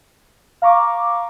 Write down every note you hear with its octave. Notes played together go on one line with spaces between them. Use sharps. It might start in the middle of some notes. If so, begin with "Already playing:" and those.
F5 A#5 C#6 D6